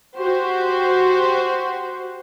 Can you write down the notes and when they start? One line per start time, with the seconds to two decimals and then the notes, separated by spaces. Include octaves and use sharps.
0.18 F#4 G4 C5